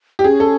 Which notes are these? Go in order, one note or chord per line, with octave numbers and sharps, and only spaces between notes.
G4
C#4 G#4
A4